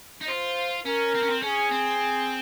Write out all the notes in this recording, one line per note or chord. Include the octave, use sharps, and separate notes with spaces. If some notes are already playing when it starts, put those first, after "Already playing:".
D#4
F4 C5
C#4 A#4
C4
C#4
C4
C#4 G#4
C4